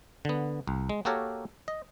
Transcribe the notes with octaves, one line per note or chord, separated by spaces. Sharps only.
D3 B3
C2
G#3
A#3 F#4 G4 A4 A#4 C#5
D#5